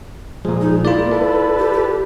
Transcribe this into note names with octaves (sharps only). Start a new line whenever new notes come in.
A#2 F3 G#3
D#4
A#3 E4 F4 D5
A4 B4
G4
G4